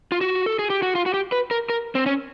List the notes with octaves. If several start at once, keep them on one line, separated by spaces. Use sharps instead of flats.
F4
F#4
A4
G#4
G4
F#4
F4
F#4
G4
B4
A#4
A#4
C4
C#4